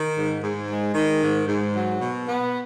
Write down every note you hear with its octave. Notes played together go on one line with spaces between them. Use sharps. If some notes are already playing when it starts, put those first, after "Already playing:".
Already playing: D#3
G#2
G#2
G#3
D#3
G#2
G#2
F#3
B2
B3